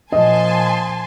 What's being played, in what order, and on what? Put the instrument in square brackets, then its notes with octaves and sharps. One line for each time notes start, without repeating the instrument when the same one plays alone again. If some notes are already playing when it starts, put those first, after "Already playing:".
[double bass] A#2 F3 [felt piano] D#5 [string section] G#5 A5 C6